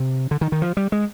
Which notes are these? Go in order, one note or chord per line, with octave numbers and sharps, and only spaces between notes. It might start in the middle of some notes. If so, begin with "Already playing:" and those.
Already playing: C3
D3
D#3
D#3
F3
G3
G#3